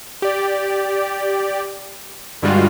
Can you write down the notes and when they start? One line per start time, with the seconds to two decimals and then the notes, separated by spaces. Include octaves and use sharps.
0.22 G4 D5
2.42 G2 D3 G3 G#3 F4 F#4